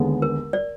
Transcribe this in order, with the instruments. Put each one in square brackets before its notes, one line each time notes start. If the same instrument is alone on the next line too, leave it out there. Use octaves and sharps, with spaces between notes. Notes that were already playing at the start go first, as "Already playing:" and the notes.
Already playing: [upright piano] D#2 D3 G#3 B3
[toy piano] A#4
D5